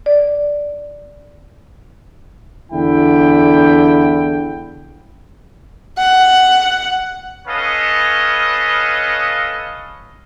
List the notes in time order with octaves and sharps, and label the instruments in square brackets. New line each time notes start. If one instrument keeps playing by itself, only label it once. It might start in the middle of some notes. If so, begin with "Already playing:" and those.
[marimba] D5
[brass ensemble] E2 D3 E4 G5
[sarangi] F#5
[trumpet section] C#4 A4 B4 C#5 D#5 F5